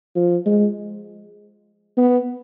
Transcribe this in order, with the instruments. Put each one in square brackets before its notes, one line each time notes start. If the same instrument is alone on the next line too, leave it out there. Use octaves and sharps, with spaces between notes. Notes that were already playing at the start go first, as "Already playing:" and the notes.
[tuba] F3
G#3
B3